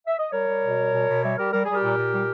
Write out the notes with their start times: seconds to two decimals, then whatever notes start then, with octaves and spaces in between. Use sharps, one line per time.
0.07 E5
0.19 D#5
0.32 G3 A#4 C#5
0.47 G3
0.62 B2
0.77 G3
0.92 B2
1.07 B2
1.23 G3 C#5 E5
1.37 G3 G4 A#4
1.52 G3 A#4
1.65 G3 G#4
1.75 G4 A#4
1.82 A#2
1.98 A#2
2.12 G3